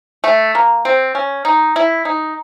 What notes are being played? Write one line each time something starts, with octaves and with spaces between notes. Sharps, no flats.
A3
A#3
C4
C#4
D#4
E4
D#4